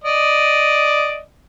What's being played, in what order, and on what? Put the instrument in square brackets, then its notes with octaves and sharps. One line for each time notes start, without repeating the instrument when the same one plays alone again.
[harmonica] D5 D#5